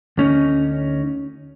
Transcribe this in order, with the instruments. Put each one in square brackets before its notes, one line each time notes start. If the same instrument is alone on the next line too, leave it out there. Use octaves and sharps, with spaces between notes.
[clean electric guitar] D2 C#4 D#4